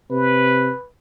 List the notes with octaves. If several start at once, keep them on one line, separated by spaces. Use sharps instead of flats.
C3 B4